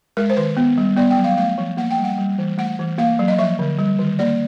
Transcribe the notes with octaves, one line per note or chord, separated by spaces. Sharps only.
G#3 A#4
C5
D#3 B4
B3
G3
B3 D5
G5
F#3
F5
A3 F5
F3
A#3 F#5
G5
G3
F#5
G3
E3
A3 F#5
E3
A#3 F5
F#3
D#5
F3 E5
D3
G3
D#3
A#3 D5